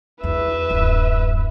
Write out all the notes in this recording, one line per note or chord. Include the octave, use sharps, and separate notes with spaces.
E2 B4 E5
D1 F#2